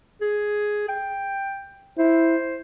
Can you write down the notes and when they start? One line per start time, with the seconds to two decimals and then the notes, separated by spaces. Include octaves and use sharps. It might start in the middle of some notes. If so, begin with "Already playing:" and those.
0.21 G#4
0.89 G5
1.98 E4 C5